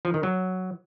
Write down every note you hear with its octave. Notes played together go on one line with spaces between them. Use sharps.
F3
D#3
F#3